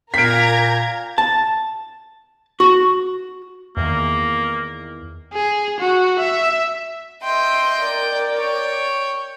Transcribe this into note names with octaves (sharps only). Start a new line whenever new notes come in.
A#2 A#4 F5 G5 A#5 G#6 B6 D7
A5
F#4
E2 D#3 A#3
G#4
F#4
E5
D#5 E5 G5 C6
A#4 D5
C#5 G5